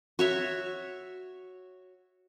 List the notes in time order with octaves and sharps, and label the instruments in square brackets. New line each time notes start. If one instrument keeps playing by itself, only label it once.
[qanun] F#4 C#5 E5